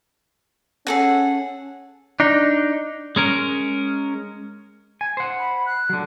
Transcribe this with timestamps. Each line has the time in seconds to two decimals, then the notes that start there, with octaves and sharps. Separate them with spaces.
0.87 C#4 G#4 A4 F#5
2.20 D4 D#4
3.16 G#3 C#4 A#4
5.01 G#5
5.17 C5 F#5
5.39 B5
5.66 F#6
5.90 D3 F#3